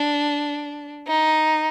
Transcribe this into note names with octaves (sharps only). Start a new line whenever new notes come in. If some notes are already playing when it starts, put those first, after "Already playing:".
Already playing: D4
D#4